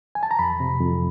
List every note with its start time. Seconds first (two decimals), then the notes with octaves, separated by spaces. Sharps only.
0.15 G#5
0.23 A5
0.31 A#5
0.39 F2 B5
0.60 C3
0.81 F2